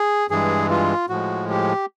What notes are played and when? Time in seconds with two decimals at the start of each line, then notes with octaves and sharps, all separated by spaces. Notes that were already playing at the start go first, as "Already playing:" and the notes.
Already playing: G#4
0.30 G2 E3 G#3 G#4
0.70 F4
1.09 A2 F3 G#3 F#4
1.50 G4